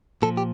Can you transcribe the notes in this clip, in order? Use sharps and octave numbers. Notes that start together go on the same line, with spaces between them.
A#2 F3 A4
G4